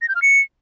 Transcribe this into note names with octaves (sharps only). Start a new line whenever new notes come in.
A#6
G6
F6
C#7